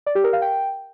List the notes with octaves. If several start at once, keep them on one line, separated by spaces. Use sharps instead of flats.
D5
G4
A#4
F5
G5